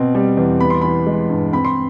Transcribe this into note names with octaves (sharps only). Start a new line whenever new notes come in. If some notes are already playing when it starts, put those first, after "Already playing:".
Already playing: B2 C4
G3
E2
B3 B5
C6
E3 B5
G#3
G2
C4 B5
C6